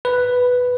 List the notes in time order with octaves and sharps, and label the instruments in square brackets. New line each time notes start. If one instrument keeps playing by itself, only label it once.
[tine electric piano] B4